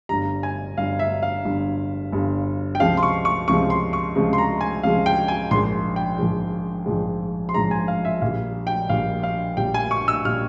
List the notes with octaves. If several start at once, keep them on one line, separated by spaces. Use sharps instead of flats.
G1 G2 G3 A#5
G#5
G1 G2 G3 F5
E5
F5
G1 G2 G3
G1 G2 G3
G5
C#2 C3 F3 G#3 F5
C6
C#6
C#6
C#2 C3 F3 G#3 C#6
C6
C#6
C#2 C3 F3 G#3
C6
A#5
G#5
C#2 C3 F3 G#3 F5
G5
G#5
A#1 G#2 F3 G#3 C6
G5
A#1 G#2 F3 G#3
A#1 G#2 F3 G#3
C6
A#1 G#2 F3 G#3 A#5
G#5
F5
E5
A#1 A#2 G3 F5
G5
A#1 A#2 G3 F5
F5
A#1 A#2 G3 G5
G#5
C#6
E6
A#2 G3 F6